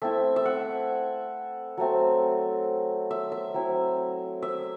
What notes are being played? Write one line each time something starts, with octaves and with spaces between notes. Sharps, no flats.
A3 C4 E4 E5
E5
F#5
F#3 A3 C4
E5
E5
F#3 C4 E4
E5